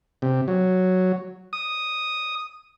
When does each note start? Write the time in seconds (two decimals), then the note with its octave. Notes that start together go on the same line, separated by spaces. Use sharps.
0.22 C3
0.48 F#3
1.53 D#6